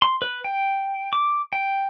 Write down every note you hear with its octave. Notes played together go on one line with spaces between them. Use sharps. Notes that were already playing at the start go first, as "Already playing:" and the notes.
C6
B4
G5
D6
G5